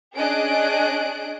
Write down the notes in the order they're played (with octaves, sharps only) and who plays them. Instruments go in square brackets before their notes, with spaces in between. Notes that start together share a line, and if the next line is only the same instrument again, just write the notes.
[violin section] C#4 D4 G#4 D#5 F#6 D7